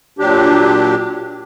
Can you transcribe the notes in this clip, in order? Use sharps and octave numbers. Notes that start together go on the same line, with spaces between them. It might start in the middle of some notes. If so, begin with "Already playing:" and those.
A#2 F#3 D4 G4